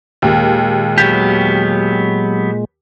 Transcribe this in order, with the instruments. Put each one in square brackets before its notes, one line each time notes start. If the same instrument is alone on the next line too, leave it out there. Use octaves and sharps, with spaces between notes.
[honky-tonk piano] D#2 [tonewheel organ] A#2 G#3
[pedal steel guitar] F#3 B3 G4